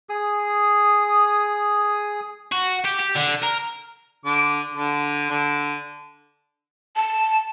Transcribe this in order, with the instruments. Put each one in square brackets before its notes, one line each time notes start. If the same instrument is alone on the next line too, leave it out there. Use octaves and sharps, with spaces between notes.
[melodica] G#4 D#6
[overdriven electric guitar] F#4
G4
G4
D3
A#4
[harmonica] D3 D6
D3
D3
[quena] A5